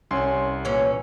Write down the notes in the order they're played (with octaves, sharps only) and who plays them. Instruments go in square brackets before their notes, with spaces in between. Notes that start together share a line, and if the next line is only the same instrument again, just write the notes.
[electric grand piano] C2 G#5 C6 [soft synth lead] C#4
[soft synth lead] A#2 [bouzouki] E3 C#4 [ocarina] C#5